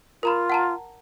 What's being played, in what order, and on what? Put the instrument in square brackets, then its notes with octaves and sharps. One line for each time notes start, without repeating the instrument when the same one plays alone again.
[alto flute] F4 [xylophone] A#4 A#5 B5
[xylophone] F#5 A5 A#5